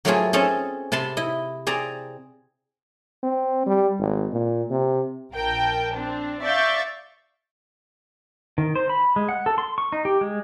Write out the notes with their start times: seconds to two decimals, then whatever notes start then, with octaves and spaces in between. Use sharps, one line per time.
0.05 F#3 A3 A#3 C4 F4 G#4
0.33 C4 C#4 G#4 A4 D#5
0.92 C3 A5 B5 C6
1.17 E4 D#5
1.67 C4 G#4 D5 A#5
3.23 C4
3.66 G3
4.00 G#1
4.33 A#2
4.70 C3
5.32 A#1 A#4 G5 A5
5.95 C4 D4
6.43 D5 E5 F5 C#6 G6 A6
8.58 D#3
8.75 C5
8.89 B5
9.16 G#3
9.29 F#5
9.46 A4
9.58 C6
9.78 C#6
9.92 D#4
10.05 G4
10.21 G#3